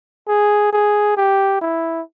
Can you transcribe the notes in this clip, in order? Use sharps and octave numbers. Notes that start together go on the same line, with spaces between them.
G#4
G#4
G4
E4